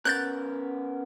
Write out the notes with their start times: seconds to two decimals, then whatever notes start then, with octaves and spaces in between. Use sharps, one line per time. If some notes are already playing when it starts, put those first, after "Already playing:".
0.05 B3 C#4 A#4 F#6 G6 A6